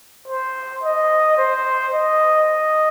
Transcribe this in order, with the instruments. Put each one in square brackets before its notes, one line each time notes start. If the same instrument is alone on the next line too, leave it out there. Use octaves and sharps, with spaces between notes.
[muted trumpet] C5
D#5
C5
D#5
D#5